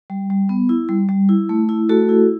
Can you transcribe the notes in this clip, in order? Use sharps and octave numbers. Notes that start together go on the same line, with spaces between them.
G3
G3
B3
E4
G3
G3
E4
A3
E4
A3 F#4 A4
E4